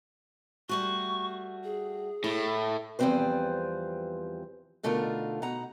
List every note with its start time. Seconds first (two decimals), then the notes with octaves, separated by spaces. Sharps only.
0.69 G3 A3 F#4 C#6
1.64 G#4
2.24 A2 E4
2.99 E2 F3 G3 C4 B4 C5
4.83 B2 D3 A3 D#4 F4 A#4
5.42 B2 D#4 F#5 A#5